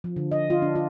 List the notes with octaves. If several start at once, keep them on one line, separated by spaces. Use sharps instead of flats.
F3
D3
D#5
F4
D4
F4